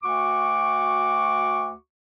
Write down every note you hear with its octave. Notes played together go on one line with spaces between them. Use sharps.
D2 F#4 C#6 D6